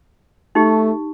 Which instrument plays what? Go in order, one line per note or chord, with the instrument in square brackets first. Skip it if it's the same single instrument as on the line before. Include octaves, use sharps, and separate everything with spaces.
[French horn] A3 [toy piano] D#4 G4